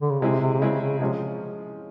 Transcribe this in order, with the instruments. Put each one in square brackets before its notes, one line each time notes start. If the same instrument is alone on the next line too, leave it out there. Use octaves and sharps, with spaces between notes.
[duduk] D3
C#3
[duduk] C3 [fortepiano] G#3 C4 E4 G#4
[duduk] C3
C3
[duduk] C#3 [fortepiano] G#3 C4 E4 G#4
[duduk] C#3
[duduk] C3 [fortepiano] F3 G#3 C#4